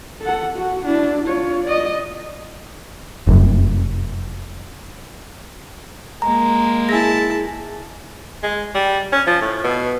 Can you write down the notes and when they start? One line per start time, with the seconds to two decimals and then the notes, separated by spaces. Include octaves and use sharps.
0.22 A4 F#5
0.55 F#4
0.85 D4 E4
1.27 F4 C#5
1.64 D5 D#5
3.27 F1 F#2
6.22 G#3 A#3 A#5
6.89 E4 G#4 G#5 A5 A#6
8.43 G#3
8.74 G3
9.12 C#4
9.26 F3
9.41 A2
9.64 B2